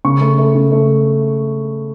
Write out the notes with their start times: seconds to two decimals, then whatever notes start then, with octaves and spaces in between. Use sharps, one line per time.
0.05 C#3 C#6
0.21 A3
0.38 A3
0.55 C#3
0.72 A3